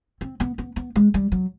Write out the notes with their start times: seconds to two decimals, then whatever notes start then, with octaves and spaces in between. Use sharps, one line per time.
0.21 C4
0.40 B3
0.58 B3
0.76 B3
0.96 G#3
1.14 G3
1.32 F#3